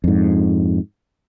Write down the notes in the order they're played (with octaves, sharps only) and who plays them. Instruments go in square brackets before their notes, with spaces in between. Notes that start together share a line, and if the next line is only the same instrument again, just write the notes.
[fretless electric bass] F2 G#2